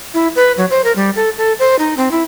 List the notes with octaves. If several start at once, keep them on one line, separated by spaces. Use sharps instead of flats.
E4
B4
F#3
C5
A#4
G3
A4
A4
C5
D#4
C4
E4